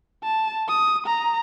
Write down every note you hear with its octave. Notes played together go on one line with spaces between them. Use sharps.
A5
D#6
A#5